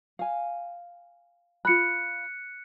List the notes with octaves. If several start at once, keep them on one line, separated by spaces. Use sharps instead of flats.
F5 G#5
F4 B5 F#6 C#7